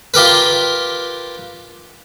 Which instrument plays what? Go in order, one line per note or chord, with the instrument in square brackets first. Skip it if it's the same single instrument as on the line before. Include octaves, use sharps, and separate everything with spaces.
[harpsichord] F4 G4 A#4 B4